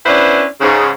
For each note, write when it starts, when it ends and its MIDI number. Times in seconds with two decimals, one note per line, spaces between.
0.06 0.44 59
0.06 0.44 61
0.06 0.44 62
0.06 0.44 64
0.06 0.44 71
0.06 0.44 72
0.61 0.89 44
0.61 0.89 49